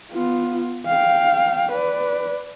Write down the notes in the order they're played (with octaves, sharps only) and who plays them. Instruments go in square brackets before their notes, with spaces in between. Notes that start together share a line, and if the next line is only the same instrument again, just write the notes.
[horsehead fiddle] B3 F4
F5 G5
B4 D5